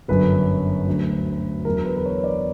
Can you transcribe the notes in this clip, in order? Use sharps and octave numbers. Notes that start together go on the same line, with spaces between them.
G1 F#2 D3 F#3 B4
D2 D3 F#3
E2 D3 F#3 A#4
B4
B4
C#5
D5